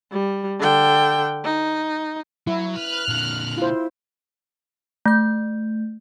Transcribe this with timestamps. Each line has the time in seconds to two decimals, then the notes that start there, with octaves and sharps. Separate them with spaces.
0.12 G3
0.60 D3 G5
1.45 D#4
2.47 F#3 E4
2.76 B4 F6 F#6
3.08 A#2 D3
3.57 E4 F4 C5
5.06 A3 G6